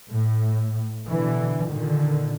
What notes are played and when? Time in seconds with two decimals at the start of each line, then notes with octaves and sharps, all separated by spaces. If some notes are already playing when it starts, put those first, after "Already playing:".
0.11 A2
1.04 B2 D3 E3
1.70 A#2 D3 D#3